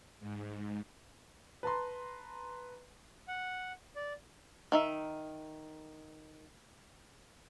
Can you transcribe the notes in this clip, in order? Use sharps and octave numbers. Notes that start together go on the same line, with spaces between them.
G#2
B4 A5 A#5 C6
F#5
D5
D#3 D#4 E5